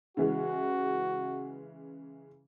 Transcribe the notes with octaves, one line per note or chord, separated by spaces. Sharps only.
C#3 E3 G#3 F#4